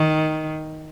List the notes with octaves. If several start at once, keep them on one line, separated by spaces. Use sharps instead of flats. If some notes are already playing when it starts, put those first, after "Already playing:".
Already playing: D#3